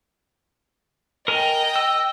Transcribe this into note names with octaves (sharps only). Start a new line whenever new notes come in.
A#4 D#5 G5 G#5 A#5
E6